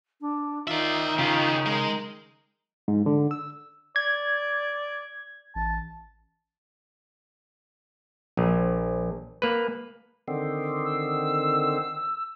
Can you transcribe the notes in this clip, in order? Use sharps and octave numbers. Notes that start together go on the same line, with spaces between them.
D4
D#3 F4 D5 E5
C#3 D#4 F4 G4
G#3 A#4
G#2
D3
E6
D5 G#6
A1 A5
A#1
A#3 B4
D3 D#3 C4
E6